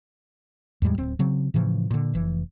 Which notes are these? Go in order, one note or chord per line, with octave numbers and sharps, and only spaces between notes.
E2 A2 G3 G#3
D1 C4
C#3 F#3 C4
A2 C#3 E3 F3
A#2 D3
F1 E3